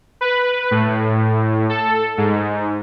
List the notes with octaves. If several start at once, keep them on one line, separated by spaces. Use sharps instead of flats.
B4
A2
A4
G#2